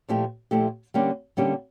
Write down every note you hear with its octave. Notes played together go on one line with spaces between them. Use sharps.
A#2 F3 A3 E4 G4
A#2 F3 A3 E4 G4
D3 G3 A#3 C#4 G4
D3 G3 A#3 C#4 G4